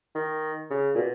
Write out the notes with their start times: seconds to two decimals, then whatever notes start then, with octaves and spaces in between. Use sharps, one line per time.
0.15 D#3
0.70 C#3
0.95 A#2
0.98 B2